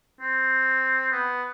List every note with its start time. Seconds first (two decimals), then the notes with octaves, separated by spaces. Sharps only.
0.21 C4
1.12 B3